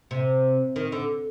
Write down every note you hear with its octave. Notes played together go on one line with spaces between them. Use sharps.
C3
D#3
D3